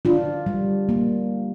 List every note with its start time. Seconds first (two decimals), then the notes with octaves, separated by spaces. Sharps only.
0.05 D4 F4
0.46 G3
0.89 A#3